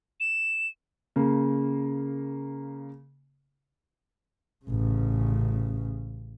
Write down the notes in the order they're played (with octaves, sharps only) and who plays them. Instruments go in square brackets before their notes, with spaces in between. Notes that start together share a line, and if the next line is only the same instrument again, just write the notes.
[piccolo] E7
[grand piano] C#3 A#3
[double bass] A1 C#3